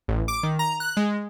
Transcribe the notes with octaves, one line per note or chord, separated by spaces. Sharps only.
A1
D6
D#3
A#5
F#6
G#3